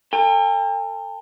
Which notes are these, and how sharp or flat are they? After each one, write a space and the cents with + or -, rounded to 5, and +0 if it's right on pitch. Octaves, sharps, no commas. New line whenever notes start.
A4 +35 G5 +45